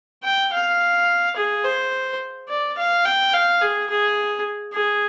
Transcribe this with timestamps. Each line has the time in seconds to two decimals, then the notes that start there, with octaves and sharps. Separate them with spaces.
0.24 G5
0.52 F5
1.36 G#4
1.64 C5
2.49 D5
2.77 F5
3.05 G5
3.33 F5
3.61 G#4
3.90 G#4
4.73 G#4